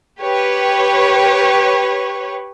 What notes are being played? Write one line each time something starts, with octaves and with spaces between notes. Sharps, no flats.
G4 B4 C#5